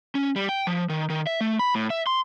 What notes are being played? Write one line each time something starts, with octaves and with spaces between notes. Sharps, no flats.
C#4
G3
G5
F3
D#3
D#3
E5
A3
B5
A2
E5
C6